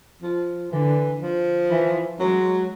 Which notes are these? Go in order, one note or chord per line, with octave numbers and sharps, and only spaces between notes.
F3
D3 E3
F3
E3
F#3 G#3